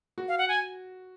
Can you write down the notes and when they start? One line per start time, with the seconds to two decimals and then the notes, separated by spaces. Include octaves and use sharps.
0.18 F#4
0.28 F5
0.38 F#5
0.48 G#5